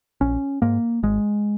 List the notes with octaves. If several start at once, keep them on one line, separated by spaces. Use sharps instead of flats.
A#1 C#4
G#2 A#3
G#1 G#3